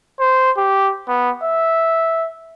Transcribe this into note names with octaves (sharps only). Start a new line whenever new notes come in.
C5
G4
B3
E5